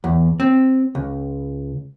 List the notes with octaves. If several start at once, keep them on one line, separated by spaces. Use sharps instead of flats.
E2
C4
C#2